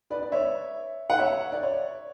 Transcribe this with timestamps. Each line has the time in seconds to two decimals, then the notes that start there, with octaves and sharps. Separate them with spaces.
0.10 B4 D5
0.23 D5
0.32 C#5 E5
1.10 F#5
1.19 C#5 E5
1.52 D5
1.63 C#5